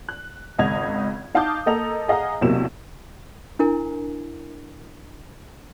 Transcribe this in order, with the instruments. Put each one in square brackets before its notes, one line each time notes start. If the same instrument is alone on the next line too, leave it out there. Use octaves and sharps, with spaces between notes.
[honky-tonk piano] F#6
G#1 C#2 D#5 G#6 F7
D#4 F5 A5 D6 D#6 G6
A#3 A4 D#5 A#5 F7
G#4 D#5 F5 F#5 A#5
B1 E2 C3 F#3 A#3 E7
[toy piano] D4 E4 A#4 G#5